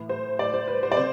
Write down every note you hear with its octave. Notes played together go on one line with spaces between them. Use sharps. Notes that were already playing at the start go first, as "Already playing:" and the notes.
Already playing: A2 E3
C5
D5
C5
B4
C5
D5
C3 C5